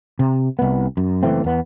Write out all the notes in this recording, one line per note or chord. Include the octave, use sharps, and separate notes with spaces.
C3
C2 B3
F#2
F#1 E3 A3 C4
E2 B3